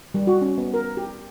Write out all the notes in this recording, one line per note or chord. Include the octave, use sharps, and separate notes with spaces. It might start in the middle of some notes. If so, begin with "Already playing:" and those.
G3
F#4
C#4
B3
A#4
G4